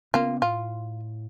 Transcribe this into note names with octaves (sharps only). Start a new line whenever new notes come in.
C#3 A#3 B3 C#4 F4
A2 F4